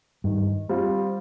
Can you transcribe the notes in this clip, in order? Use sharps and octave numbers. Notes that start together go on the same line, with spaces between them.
G2 D#3
G3 C4 F4